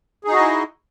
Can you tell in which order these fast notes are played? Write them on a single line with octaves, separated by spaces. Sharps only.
G#4 D#4 F#4 D#5 E4